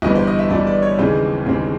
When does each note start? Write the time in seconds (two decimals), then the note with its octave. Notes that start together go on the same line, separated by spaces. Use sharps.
0.02 G1 G2 E3 D#5
0.15 C5
0.27 D#5
0.39 E5
0.50 G1 G2 E3 D5
0.67 D5
0.83 C#5
0.98 D#2 C#3 E3 G#3 C4 C5
1.46 D#2 C#3 E3 G#3 C4